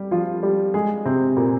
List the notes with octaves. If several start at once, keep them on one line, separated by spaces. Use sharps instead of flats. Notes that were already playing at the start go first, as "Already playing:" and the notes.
Already playing: G3 G4
F3 F4
G3 G4
G#3 G#4
C3 C4
A#2 A#3